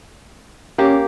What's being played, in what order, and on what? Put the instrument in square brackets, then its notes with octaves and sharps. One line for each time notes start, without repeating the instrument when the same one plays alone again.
[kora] A#3 G4 [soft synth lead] C#4